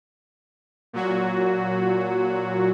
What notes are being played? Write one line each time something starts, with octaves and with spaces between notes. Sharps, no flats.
A#2 F#3 F#4